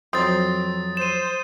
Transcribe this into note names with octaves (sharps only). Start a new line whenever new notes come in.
F2 F#3 C4 D#6 A6
C5 D#7 E7